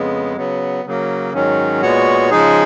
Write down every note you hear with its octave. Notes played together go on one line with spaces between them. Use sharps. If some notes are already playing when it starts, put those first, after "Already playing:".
Already playing: F2 C#3 G#3 B3
C#3 F#3 B3
C#3 F#3 A#3
G#2 D#3 F#3 C#4
A#2 G#3 B3 F#4 C#5
C#3 F3 G#3 D#4 G#4